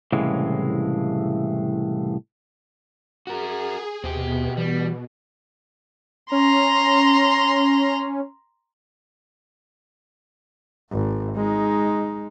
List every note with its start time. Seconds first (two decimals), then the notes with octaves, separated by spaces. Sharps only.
0.12 C2 A2 C#3 E3 G#3
3.27 F#4 G#4 A#4
4.04 D#2 B2 C4 G4
4.57 E3 G3
6.32 C#4 A#5 C6
10.91 G#1
11.36 G#3 D#4